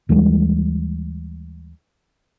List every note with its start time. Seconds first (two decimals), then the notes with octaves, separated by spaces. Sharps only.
0.09 D#2 E3 G3 G#3